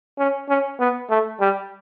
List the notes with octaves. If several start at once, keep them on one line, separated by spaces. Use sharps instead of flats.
C#4
C#4
B3
A3
G3